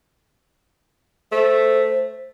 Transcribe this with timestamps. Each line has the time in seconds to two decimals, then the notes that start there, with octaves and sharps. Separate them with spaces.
1.32 A3 C5